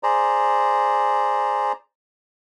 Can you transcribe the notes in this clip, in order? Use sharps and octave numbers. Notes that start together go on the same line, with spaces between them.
G#4 C5 D5 A#5